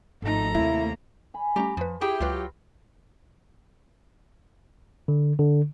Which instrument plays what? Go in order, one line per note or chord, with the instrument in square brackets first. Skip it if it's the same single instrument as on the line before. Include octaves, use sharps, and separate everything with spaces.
[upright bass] G#1 [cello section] F3 A3 D#4 [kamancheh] A4 A#5
[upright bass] D#2 [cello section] C3 A3 A#3 [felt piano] E4
[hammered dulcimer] G#5 B5
[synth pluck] G3 A3 C#4 [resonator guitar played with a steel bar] G4 A#5
[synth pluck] F2 B4 [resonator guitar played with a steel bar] F3
[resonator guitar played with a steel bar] E4 G#4 G5 [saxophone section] G4
[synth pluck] C#2 B4 [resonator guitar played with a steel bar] F#3 F4
[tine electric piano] D3
D3